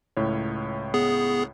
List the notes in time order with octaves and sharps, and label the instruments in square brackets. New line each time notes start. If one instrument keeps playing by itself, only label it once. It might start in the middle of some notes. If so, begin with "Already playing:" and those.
[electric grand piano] C#2 A2 C#5
[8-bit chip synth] B3 G#4